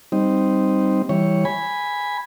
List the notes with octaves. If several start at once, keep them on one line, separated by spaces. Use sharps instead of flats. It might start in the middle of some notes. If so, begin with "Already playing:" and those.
G3 C4 D#4
E3 G3 C#5
G#5 B5